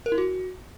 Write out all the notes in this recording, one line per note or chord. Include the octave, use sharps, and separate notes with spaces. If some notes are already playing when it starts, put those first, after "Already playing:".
A#4
E4
F#4